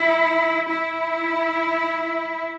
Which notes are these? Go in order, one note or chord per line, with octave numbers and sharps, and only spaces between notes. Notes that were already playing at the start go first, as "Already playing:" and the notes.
Already playing: E4
E4